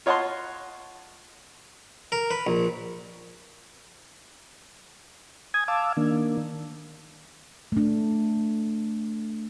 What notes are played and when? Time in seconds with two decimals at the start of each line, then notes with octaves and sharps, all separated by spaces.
0.06 F4 C#5 D#5 F#5 A5 C6
2.12 A#4
2.31 B4
2.47 A#1
5.54 G#5 D#6 G#6
5.68 F5 A5 D6 E6
5.97 D#3 A#3 D4
7.72 A3 D4